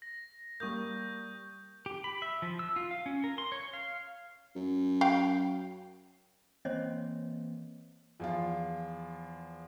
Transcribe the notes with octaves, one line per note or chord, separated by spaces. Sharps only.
A#6
G3 A#3 C#6 D#6 G6
G4
B5
E5
F3
E6
F4
F5
C#4
A#4
C6
C#5
F5
F#2
F5 G5
E3 A#3 C4 C5 C#5 D#5
E2 F3 F4